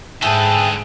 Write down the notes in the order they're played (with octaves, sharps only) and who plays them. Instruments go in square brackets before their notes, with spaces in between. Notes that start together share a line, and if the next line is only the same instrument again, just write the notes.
[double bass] G#2 [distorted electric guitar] D3 B4 [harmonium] G#4 E5 G5 [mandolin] A4